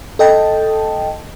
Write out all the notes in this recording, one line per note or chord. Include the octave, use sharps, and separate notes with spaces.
A4 D#5 G5 A5